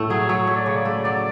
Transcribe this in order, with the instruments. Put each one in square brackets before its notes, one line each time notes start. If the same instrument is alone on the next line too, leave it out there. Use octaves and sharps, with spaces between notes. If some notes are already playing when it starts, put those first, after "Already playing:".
Already playing: [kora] A2 A3
[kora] F#3 [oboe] G#4
[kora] F#3 [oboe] C#5
[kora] A3 [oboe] C#5
[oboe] D5
[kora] C#3 [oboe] C#5
[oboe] D5
[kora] A3
[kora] F#3 [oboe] D5